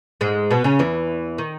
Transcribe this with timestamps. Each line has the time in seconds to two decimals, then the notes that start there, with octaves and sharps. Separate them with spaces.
0.21 G#2 G#3
0.51 B2 B3
0.64 C#3 C#4
0.79 E2 E3
1.38 D#3